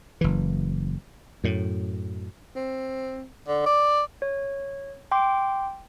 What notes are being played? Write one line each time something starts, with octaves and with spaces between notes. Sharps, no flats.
F#1 E3
F#2 A2
C4
D3
D5
C#5
G5 C6 D6